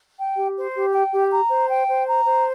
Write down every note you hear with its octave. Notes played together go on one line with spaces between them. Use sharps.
G5
G4
C5
G4
G5
G4
A#5
C5
G5
C5
A#5
C5